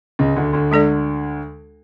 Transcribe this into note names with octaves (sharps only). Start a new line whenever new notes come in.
C#2 C#3
D2 D3
D2 D3
G#3 D4 A4 D5